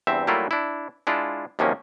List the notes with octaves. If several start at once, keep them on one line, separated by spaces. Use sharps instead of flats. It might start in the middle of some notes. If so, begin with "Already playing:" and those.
E2 G2 C4 E5
F#3 G3 A3 A#3 E4 F4
D4 E4
G#3 D4 E4 F4
D#2 C3 F3 F#3 A#3 C#4